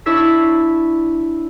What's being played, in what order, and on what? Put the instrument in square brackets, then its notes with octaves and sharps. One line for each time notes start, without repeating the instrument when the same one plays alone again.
[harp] D4 E4 C#5 E6 B6 C7